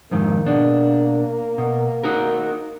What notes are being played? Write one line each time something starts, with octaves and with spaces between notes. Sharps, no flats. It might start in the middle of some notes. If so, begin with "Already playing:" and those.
F2 G#2 D#3 A#3
B2 D4
B2
D#4 F#4 A#4